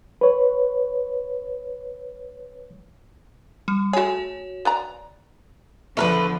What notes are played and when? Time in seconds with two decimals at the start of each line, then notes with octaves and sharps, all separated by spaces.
0.21 B4 C#5
3.68 G3
3.93 A3 F#4 G#4 C#5
4.65 B4 D5 A#5
5.97 E2 D3 F3 A3 A#4 B4